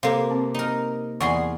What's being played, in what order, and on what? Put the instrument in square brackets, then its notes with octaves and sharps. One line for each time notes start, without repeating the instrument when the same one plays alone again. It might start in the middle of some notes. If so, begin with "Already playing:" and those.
[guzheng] C3 A#3 [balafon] A4 F5
[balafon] C4
[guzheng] D#4 A#4
[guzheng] E2 G#4 C6 [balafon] D5 F#5 C#6